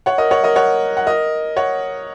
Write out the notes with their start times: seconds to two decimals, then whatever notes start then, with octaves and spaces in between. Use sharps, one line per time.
0.06 C#5 F#5
0.18 A#4 D#5
0.31 C#5 F#5
0.44 A#4 D#5
0.56 C#5 F#5
0.97 F#5
1.07 A#4 D#5
1.56 C#5 F#5